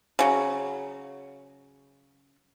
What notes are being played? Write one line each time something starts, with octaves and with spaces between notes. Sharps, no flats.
C#3 F#3